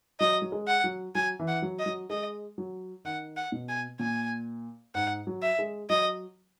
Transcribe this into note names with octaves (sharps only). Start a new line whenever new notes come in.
F#3 D#5
F#3
G#3
F#5
F#3
F#3 G#5
E3
F#5
F#3
D#5
F#3
G#3 D#5
F#3
D#3 F#5
F#5
B2
G#5
A#2 G#5
G#2 F#5
F#3
E5
G#3
F#3 D#5